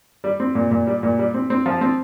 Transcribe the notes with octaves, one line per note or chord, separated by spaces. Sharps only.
G3
C4
A#2
A#2
G3
A#2
G3
C4
C4
F3
C4